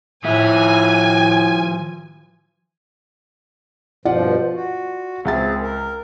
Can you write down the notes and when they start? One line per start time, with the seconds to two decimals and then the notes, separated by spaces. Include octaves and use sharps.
0.24 A2 D#3 F3 E5 G#5
4.05 G2 B2 F3 F4 D5 F#5
4.53 F#4
5.25 C#2 C4 G#4 E5 A6
5.61 A#4